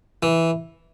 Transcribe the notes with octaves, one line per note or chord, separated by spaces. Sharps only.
E3